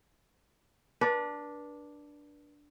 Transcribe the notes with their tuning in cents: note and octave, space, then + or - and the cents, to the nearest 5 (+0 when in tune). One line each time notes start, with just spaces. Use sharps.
D4 +0 B4 -35